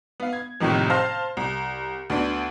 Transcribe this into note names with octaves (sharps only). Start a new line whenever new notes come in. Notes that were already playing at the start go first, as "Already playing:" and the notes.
B3 F5
G#6
F#1 A2 C3 D#3 F3
C5 F5 A5 C6 F6 A#6
C2
D2 B3 D4